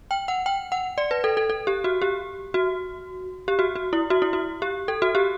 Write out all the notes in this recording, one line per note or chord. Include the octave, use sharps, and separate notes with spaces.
G5
F#5
G5
F#5
D5
B4
A4
A4
A4
G4
F#4
G4
F#4
G4
F#4
F#4
E4
F#4
E4
F#4
G4
A4
F#4
G4